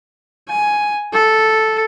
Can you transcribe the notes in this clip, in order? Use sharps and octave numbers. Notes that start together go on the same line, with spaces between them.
G#5
A4